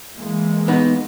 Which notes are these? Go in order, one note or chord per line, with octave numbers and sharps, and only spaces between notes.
E3 G#3 A#3
B3 D#4